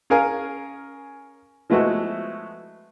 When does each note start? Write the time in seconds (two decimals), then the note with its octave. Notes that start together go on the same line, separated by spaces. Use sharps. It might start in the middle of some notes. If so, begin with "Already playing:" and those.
0.10 C#4 G#4 A#4 F5 G#5
1.70 F3 G#3 A3 B3 E4 F#4